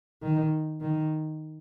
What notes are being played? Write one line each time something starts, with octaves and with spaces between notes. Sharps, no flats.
D#3
D#3